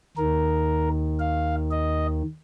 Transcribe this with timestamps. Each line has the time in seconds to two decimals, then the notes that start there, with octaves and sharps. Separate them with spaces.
0.17 D#2 D#3 A#4
1.19 F5
1.71 D#5